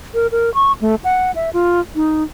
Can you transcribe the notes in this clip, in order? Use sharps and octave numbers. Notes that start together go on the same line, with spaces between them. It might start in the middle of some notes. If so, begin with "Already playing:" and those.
A#4
A#4
C#6
A3
F#5
E5
F4
D#4